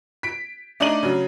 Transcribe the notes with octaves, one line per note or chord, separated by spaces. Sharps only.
B6 D7
A3 D4 D#4 D5 D#7 F#7
C#3 F#3